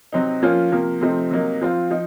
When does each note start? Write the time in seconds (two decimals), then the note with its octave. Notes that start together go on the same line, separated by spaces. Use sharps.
0.13 C3 F#3 C4 D#4
0.42 F3 A#3 C#4 F4
0.72 C3 F3 A#3
1.01 C3 F3 A3 C4 D#4
1.31 C3 F#3 A#3 D#4
1.61 F3 C4 F4
1.91 F3 D#4